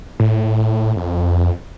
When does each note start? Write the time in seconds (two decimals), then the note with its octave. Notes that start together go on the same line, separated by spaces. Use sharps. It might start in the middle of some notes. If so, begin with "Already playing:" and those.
0.20 A2
0.96 F2